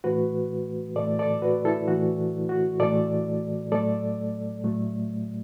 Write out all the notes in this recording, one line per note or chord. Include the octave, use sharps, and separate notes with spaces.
A2 E3 A3 F#4 B4
A2 E3 A3 A4 D5
A4 D5
F#4 B4
E4 A4
A2 E3 A3 F#4
F#4
A2 E3 A3 A4 D5
A2 F#3 A3 A4 D5
A2 F#3 A3